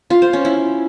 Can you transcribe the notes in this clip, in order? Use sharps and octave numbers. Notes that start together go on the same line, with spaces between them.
F4
C5
C#4
E4